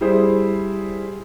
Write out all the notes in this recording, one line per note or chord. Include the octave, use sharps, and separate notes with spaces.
G3 E4 G#4 C5